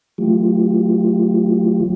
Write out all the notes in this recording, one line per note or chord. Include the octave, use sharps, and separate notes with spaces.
E3 F#3 A3 F4 G4